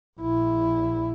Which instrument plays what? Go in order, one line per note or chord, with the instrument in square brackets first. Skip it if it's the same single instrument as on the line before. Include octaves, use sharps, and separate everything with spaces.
[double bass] A#1 E4